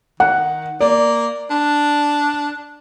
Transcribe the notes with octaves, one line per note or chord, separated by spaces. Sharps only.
D#3 F#5
A#3 D5
D4